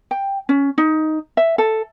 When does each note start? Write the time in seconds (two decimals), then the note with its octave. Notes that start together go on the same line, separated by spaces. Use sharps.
0.11 G5
0.49 C#4
0.78 D#4
1.37 E5
1.58 A4